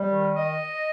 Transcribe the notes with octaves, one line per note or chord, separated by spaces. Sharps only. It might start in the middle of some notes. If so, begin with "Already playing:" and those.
Already playing: G3
D#3
D#5